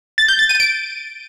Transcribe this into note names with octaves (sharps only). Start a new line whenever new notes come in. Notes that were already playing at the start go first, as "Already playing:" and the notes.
A6
G6
A6
D#7
D7